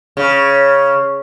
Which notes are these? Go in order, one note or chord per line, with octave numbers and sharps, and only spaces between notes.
C#3